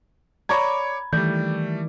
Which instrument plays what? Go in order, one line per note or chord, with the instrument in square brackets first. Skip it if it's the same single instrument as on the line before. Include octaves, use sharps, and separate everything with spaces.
[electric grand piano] C#5 D6 G#6 [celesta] D5 C#6 [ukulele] A#5 B5
[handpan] D#3 E3 D5 [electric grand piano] G3 A3 [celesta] G6